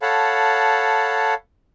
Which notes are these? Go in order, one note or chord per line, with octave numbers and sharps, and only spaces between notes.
A4 C#5 F5 F#5 A5 B5